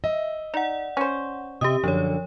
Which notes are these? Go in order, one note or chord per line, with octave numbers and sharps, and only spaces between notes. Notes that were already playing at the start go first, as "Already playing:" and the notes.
D#5 E5
D#4 D5 F#5
C#4 C5
C3 G4 D#5 E5 D#6
F#2 D3 F3 C#5